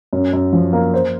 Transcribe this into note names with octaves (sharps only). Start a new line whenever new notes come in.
F#2
F#2
F3
A#3
C5